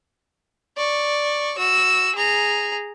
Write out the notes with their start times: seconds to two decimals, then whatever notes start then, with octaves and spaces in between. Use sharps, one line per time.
0.77 D5 C#6
1.58 F#4 E6
2.15 G#4 A#5